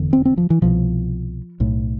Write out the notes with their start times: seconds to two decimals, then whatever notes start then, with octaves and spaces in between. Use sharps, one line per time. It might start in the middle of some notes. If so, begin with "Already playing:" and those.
Already playing: F1 E2 D3
0.13 C4
0.25 C4
0.37 F3
0.50 E3
0.62 C2 B2 F3
1.60 B1 A2